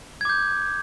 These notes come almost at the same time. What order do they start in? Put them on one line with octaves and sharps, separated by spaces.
G#6 D6 G6